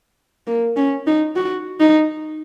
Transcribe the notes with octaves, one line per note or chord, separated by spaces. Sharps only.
A#3
C#4
D#4
F#4
D#4